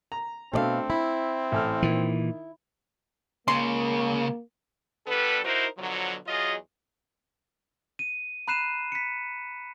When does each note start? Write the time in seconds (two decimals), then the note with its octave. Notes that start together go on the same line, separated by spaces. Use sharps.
0.12 A#5
0.54 B2 A3 C4 D4 A4 D5 F5
0.90 E4 B5
1.52 A1 A4 F6
1.82 A#2 D#3 E3
3.48 C#2 C#3 A#3 C6
5.07 D3 G3 B3 A4 B4
5.43 D#4 E4 F#4 A#4 C5
5.77 B2 D3 F3 F#3
6.27 E2 F#3 F4 G#4 D#5
7.99 D#7
8.48 A#5 B5 F#6 C7 D#7 E7
8.92 B6 C#7